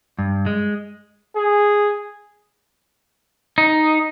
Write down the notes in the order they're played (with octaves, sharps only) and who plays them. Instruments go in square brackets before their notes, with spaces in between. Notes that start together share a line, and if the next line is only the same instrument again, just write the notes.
[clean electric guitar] G2
G#3
[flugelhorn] G#4
[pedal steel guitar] D#4